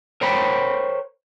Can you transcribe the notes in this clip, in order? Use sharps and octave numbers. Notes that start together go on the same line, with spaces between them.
A#4 C5 C#5 G5 B5